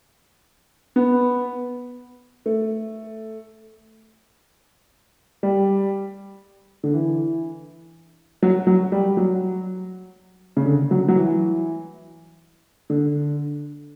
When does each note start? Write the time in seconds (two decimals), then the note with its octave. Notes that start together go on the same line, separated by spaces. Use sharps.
0.96 B3
2.46 A3
5.43 G3
6.84 D3
6.93 E3
8.42 F#3
8.67 F#3
8.92 G3
9.17 F#3
10.57 C#3
10.66 D3
10.91 F#3
11.08 F#3
11.16 E3
12.90 D3